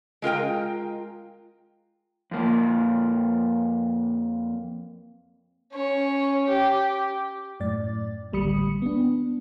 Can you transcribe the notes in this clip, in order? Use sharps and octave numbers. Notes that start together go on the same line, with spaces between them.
G#3 F4 A#4 G5
F2 A#3
C#4 C#5
G4
F#2 A2 D5 A6
A1 D2 G3 B5 D#6 C#7
B3 D4